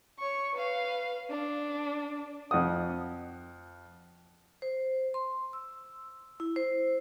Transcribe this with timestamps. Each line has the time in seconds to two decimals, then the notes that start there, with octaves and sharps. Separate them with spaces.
0.19 C#5 C#6
0.54 B4 F5
1.30 D4
2.51 F2 F#5 D#6
4.62 C5
5.14 C6
5.53 E6
6.40 E4
6.56 C5